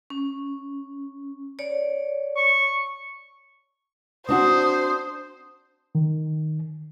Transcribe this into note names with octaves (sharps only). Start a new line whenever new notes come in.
C#4
C#5 D5
C#6
C4 D4 F#4 C5 D#6
D#3